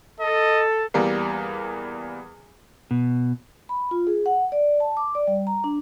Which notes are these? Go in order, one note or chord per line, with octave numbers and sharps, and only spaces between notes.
A4 D#5
E2 G3 A#3
B2
B5
F4
G#4
F#5
D5
A5
D6
D5
G3
A#5
D4